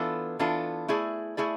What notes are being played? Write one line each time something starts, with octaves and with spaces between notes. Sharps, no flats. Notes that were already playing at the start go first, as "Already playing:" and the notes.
Already playing: E3 B3 D4 F4 A4
E3 B3 D4 F4 A4
A3 E4 G#4 D5
A3 E4 G#4 D5